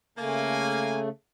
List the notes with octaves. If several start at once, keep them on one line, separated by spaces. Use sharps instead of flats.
C#3 A3 A#3 G#5